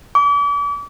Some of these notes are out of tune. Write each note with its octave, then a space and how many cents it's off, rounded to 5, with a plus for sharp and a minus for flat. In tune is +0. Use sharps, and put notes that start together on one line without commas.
D6 -40